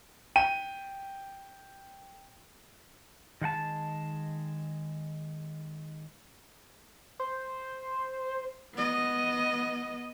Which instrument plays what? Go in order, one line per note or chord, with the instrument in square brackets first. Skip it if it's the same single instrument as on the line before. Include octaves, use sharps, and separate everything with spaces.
[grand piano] G5 D#7
[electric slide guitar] D#3 G#3 F#5 A5
[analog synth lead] C5
[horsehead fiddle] B3 D#5